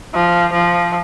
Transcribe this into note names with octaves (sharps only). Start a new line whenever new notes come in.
F3
F3